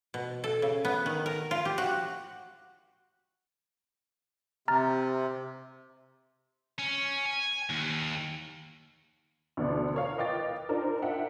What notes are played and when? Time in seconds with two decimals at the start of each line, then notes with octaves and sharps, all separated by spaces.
0.14 B2
0.44 A4
0.62 C#3
0.85 B3
1.06 D#3
1.26 A#4
1.51 F4
1.65 G4
1.78 F#4
4.68 C3 A#5 F6 A6
6.79 C#4
7.25 G#5
7.70 D#2
9.57 D2 B2 D3 D5
9.94 A#4 C#5 F5
10.18 B4 D#5 F5 G5 D6 A6
10.69 D4 D#4 F4 A#4 C5
11.02 D4 E5 F#5 G5